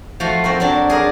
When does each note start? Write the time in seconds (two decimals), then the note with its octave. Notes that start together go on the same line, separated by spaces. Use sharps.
0.20 F3 A3 F4 F#4
0.44 C4 F#4 A#4
0.60 F#3 C4 D4
0.90 G#4 A#4 D5